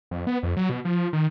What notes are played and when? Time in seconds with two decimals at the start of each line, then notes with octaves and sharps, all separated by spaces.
0.11 F2
0.27 B3
0.43 F2
0.57 F#3
0.69 B2
0.85 F3
1.13 D#3